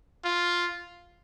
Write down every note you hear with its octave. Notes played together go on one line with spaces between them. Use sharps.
F4